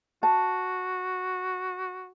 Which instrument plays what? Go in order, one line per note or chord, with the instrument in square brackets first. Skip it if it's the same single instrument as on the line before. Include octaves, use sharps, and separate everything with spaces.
[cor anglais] F#4 [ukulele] A5